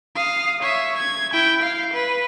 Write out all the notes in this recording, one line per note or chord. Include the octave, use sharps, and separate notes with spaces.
F5 D#6
C#5 E5
G#6
E4 G5
F5
B4